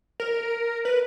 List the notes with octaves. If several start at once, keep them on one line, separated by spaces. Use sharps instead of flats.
A#4
B4